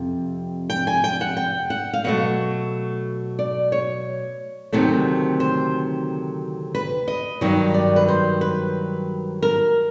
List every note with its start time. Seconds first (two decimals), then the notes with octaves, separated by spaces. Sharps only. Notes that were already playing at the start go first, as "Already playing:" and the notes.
Already playing: F2 C3
0.70 G5
0.87 G#5
1.04 G5
1.21 F#5
1.37 G5
1.70 F#5
1.93 F5
2.04 B2 F#3 A3 F#5
3.39 D5
3.72 C#5
4.73 D2 C3 D#3 F#3 A3
5.40 C5
6.75 B4
7.08 D#5
7.41 G2 D#3 F#3
7.74 D5
7.96 B4
8.08 C5
8.41 B4
9.43 A#4